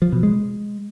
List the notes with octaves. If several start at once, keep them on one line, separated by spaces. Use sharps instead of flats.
F3
B2
G#3